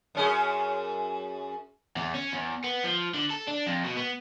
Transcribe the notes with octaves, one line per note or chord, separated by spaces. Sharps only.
F#2 C#4 G#4
E2
C#4
E2
B3
F3
D3
A4
D4
F2
B2
B3